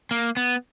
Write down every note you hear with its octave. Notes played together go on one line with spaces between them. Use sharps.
A#3
B3